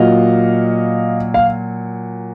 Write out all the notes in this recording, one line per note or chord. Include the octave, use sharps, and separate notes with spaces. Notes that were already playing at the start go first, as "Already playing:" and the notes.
Already playing: A#2 F#3 D#5 F5
F5